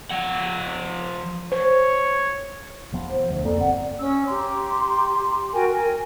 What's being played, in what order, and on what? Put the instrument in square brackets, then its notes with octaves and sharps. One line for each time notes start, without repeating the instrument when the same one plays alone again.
[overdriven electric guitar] F3 F#5
[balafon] C5 [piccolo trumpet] C#5
[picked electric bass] E1 F3 B3
[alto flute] C5
[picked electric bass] D2
[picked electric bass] F2 A#3 B3 [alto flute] A4 [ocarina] D5
[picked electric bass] G1 C4 [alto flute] F#5
[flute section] C#4 E6
G4 A#5 C6
F#4 A#4 G5 G#5
A#4 G#5